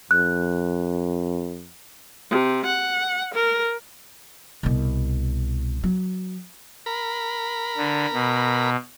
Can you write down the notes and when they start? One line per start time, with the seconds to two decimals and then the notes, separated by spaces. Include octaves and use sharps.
0.11 F2 F#6
2.30 C3
2.66 F#5
3.35 A#4
4.63 C2 B2
5.84 F#3
6.86 A#4 B5
7.77 D3
8.13 B2